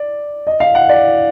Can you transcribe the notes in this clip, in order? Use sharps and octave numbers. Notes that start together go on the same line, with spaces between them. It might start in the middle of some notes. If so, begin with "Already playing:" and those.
Already playing: D5
D#5
F5
F#5
D5